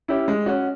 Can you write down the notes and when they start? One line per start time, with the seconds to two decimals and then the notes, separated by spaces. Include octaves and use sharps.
0.08 C#4 E4 G4
0.28 G#3
0.46 C#4 F#4